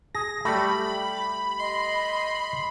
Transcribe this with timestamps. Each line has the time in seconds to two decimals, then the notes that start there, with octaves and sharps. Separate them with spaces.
0.15 G#4 A#6
0.45 G3 A3 G4 B5
1.60 D#5 C6